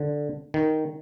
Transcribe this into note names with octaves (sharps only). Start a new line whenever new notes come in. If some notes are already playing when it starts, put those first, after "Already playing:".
Already playing: D3
D#3